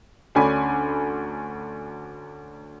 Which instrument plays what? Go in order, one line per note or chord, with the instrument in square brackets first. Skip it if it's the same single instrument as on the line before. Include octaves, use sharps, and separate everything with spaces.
[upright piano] D2 C#4 D4 G#5 B5 D6